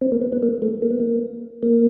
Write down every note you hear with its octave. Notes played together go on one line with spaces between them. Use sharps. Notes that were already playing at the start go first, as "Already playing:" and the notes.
C4
A#3
B3
B3
A#3
A3
A#3
B3
A#3
A#3